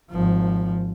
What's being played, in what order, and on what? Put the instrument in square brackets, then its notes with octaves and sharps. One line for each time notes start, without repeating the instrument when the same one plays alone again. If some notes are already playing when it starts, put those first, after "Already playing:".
[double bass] G#1 F3